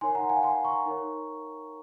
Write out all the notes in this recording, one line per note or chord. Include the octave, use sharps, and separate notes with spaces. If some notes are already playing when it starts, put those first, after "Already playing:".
D#4 A#4 C#5 G#5 C6
F#5 A#5
F5 G#5
G#5 C6
A#5 C#6
D#4 A#4 C#5